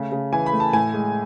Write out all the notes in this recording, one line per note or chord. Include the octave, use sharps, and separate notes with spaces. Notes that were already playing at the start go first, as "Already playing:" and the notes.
Already playing: C#3 A3
C#3
E3 G#5
B5
A3
A5
A2 G#5
G#3